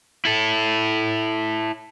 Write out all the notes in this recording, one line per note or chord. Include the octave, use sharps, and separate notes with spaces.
E4 A4